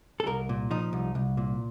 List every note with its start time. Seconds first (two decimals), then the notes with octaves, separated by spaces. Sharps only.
0.20 A4
0.26 C2 A#4
0.49 A#2
0.71 F3 D#4
0.93 C2
1.15 C2
1.37 A#2